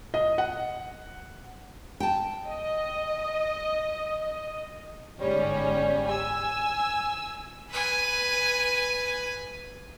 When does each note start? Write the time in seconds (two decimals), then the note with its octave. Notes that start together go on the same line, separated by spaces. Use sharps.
0.14 D#5
0.38 F#5
2.00 G5 A5
2.48 D#5
5.20 G1 G#2 G3 C#4
6.08 G#5 E6
7.71 B4 G#5